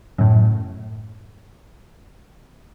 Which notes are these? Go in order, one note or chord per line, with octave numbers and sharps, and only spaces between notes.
F#2 A2